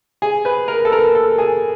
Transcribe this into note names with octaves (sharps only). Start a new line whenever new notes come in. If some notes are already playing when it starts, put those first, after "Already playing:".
G#4
B4
A#4
A4
A#4
A4
G#4